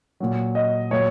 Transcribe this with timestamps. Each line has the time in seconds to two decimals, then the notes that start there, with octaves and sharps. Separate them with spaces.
0.20 A#2 F#3
0.55 D#5
0.91 A#2 F#3 C#5